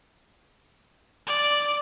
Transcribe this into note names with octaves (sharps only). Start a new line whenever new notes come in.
D5